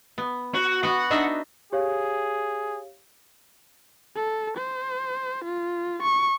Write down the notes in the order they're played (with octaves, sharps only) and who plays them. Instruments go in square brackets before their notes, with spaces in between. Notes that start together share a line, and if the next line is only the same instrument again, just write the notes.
[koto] B3
[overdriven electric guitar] F#4
[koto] B3 F#4 [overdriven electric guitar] F#5
[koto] D4 D#4 E5
[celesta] G4 C#5 F5 [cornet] G#4
[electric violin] A4
C5
F4
C#6